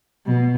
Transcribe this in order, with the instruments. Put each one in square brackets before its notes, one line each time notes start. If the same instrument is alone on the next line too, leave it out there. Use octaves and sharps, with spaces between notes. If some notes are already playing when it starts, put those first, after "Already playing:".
[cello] B2